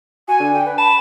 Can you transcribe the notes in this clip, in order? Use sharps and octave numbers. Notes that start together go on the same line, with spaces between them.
F#4 G#5
D3
G5
B4
A5 B5